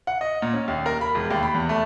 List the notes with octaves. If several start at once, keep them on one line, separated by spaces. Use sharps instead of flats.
F#5
D#5
A#2
C#4
D#2
A#4
B5
E1
D#2
B5
E2
A3